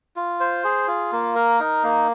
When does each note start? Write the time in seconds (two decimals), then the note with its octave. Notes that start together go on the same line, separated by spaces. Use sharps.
0.16 F4
0.40 C5
0.64 G#4
0.88 F4
1.12 A#3
1.36 A#4
1.60 D#4
1.83 A#3